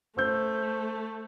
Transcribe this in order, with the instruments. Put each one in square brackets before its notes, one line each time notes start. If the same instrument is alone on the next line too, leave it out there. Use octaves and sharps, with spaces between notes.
[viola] A3 [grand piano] C5 E6 G6